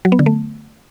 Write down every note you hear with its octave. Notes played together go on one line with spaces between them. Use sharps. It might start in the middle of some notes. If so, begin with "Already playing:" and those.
F#3
B3
D3
A3